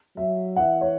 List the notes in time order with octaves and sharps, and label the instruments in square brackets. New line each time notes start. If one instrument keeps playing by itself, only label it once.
[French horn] F#3 [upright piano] E5
[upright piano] F#5
[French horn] E3 [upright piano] E5
[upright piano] C#5